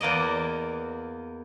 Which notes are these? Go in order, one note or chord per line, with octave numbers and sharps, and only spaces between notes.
E2 A#3 D5 D#5